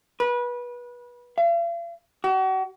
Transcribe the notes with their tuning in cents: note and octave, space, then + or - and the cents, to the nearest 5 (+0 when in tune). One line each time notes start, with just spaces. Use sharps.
B4 -25
F5 -45
F#4 +40